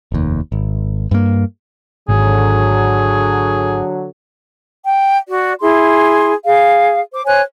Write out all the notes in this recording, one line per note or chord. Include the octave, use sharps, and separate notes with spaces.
F1 D#2
G#1
G2 A#3
G#1 D3 F#3 G#4
G5
F#4 D5
E4 G#4 C6
G#4 F5
C5 D6
C5 C#5 G#5 F#6